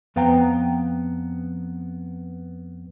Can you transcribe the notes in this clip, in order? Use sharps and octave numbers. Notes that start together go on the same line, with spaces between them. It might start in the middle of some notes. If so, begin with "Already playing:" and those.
F2 B3 F5 G5 A#5